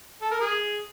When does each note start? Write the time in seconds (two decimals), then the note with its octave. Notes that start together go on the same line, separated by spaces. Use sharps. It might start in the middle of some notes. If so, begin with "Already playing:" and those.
0.22 A4
0.31 A#4
0.41 G#4